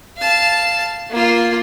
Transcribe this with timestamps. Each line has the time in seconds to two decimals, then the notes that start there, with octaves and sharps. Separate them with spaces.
0.17 F5 A5
1.10 A#3 F4